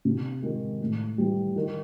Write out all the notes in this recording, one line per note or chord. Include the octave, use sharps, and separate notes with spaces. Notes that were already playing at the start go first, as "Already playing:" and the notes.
C3
D#3 G#3
A2
E3 G3
D#3